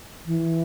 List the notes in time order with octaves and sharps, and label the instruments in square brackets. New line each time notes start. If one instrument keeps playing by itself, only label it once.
[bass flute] E3